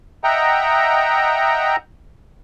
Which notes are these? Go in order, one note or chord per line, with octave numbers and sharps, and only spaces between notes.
D#5 E5 F#5 G5 A#5